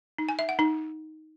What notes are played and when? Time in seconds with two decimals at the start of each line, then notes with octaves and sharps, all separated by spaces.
0.18 D#4
0.29 G#5
0.39 E5
0.49 F#5
0.59 D#4